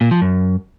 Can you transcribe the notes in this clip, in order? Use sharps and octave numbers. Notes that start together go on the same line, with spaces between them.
A#2
F3
F#2